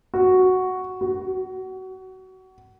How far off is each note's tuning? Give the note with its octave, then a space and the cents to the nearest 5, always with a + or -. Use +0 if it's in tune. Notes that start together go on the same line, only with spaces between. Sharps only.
F#4 +0
F#4 +25